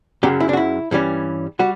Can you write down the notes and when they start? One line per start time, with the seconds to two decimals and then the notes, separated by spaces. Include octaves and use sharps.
0.23 F#2 C#3 F#3 G4
0.40 E4
0.49 D4
0.53 F#4
0.57 E4
0.91 G2 E3 G3 C#4
1.59 G3 F#4